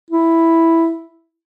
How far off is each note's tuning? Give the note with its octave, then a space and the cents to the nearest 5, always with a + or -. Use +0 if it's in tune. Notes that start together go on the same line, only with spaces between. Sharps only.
E4 +0